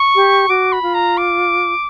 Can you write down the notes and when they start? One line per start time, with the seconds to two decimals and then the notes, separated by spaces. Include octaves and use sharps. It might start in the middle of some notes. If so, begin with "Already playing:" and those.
Already playing: C#6
0.15 G4
0.49 F#4 D6
0.72 B5
0.83 F4
0.94 A#5
1.17 D6